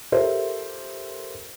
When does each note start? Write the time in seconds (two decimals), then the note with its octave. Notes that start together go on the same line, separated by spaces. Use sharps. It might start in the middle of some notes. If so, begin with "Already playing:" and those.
0.12 F4 G4 A4 A#4 C5 E5